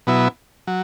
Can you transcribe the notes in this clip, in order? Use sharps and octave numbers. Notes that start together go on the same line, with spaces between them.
B2 F#3 B3 E4
F#3